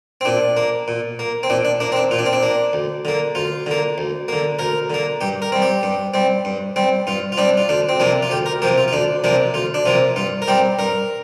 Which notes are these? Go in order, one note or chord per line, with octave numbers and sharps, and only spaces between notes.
C4
A#2 D4
A#3
A#2
A#3
C4
A#2 D4
D4
A#3 D4
C4
D4
A#2 F4
D4
C4
D4
A#3
D2
D3 A#3
D2 F4
D3 A#3
D2
D3 A#3
D2 A#4
D3 A#3
G2 G4
A#4
G3 C4
G4
G2
G3 C4
G2
G3 C4
G2 F4
F4
G3 C4 D4
F4
D2 D4
C4
C3 F3 A#3 D4
F4
D2 G4
A#4
C3 F3 A#3 G4
F4
F4
D2 D4
C3 F3 A#3 D4
D2 F4
D4
C3 F3 A#3 F4
G2 F4
A#4
G3 C4 G4
G2 A#4